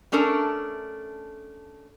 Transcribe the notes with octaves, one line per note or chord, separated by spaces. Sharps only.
A3 C#4 D4 A4 A#4